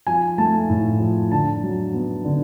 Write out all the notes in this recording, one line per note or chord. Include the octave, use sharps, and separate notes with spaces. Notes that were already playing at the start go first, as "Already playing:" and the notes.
F3 G#5
A3 A5
A2
F3
D3 A5
F#3
B3
D3